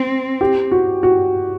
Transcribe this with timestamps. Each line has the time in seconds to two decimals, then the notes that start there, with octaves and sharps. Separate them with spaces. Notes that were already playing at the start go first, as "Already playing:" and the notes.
Already playing: C4
0.41 G4
0.72 F#4
1.03 F#4